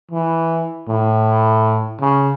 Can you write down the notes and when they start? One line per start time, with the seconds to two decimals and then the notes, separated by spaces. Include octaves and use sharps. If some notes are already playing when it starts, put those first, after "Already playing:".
0.11 E3
0.88 A2
2.01 C#3